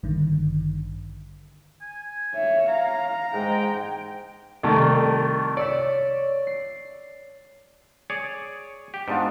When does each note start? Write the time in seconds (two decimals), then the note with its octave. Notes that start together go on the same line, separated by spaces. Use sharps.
0.03 A1 G2 D3 D#3
1.81 G#5
2.34 C#5 E5
2.69 F5 A#5
3.34 G#2 G#3 G5
4.63 C2 D#3 A3 A5
5.57 C#5 D5 E6 B6
6.47 C7
8.10 G#4 C#5 D5
8.94 G4
9.08 G#2 B3 D4 F4